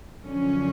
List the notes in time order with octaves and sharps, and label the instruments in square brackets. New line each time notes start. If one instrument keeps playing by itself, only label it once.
[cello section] F#2 D3 F3 C#4